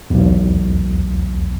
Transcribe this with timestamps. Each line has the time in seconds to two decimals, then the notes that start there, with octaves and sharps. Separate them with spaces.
0.10 B1 E2